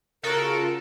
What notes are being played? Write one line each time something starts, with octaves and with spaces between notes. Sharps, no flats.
C#3 F4 F#4 A4 A#4